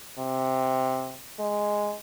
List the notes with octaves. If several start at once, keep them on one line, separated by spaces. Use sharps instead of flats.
C3
G#3